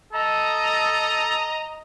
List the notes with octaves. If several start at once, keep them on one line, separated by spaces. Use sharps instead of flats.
A4 D#5 A#5